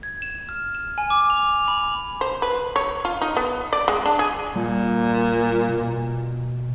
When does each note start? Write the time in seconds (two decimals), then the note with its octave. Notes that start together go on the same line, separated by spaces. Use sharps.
0.03 G#6
0.22 E7
0.49 F6
0.75 E7
0.98 G#5
1.10 D6
1.30 F7
1.68 B5
2.21 C5
2.42 B4
2.76 C#5
3.05 F4
3.21 D#4
3.37 B3
3.73 D5
3.88 G#3
4.06 D4
4.19 G#4
4.55 A#2 G3
5.69 B2